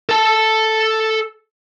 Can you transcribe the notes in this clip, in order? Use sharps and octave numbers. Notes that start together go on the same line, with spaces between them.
A4 A5